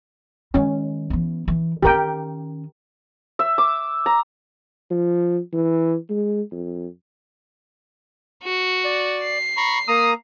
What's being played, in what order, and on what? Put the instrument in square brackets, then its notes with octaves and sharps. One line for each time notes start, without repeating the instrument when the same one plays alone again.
[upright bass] D#3 G#3 [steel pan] C#4
[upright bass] E3 B3
E3
[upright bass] D#3 C#4 [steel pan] G4 A#4 G5
[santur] E5
D6
A#5
[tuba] F3
E3
G#3
F2
[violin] F#4
[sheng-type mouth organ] D5
[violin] C7
[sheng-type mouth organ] A#5 B5 C#6
[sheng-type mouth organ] A#3 A#5 [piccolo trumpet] D#6